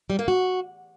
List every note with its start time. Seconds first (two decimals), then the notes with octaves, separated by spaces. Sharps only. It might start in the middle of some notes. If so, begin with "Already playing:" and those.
0.10 G3
0.19 A#3
0.28 F#4